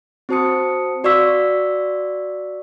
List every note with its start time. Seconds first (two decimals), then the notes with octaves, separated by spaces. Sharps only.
0.29 C4 F#4 C5 A5 D#6 C#7
1.04 F#4 D5 F5 C#6 E6 B6